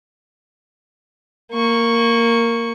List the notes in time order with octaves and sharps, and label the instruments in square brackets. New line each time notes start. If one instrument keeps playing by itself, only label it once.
[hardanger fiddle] A#3 C#6